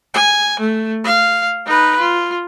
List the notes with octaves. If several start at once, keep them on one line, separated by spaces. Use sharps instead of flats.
G#5
A3
F5
D#4 B4
F4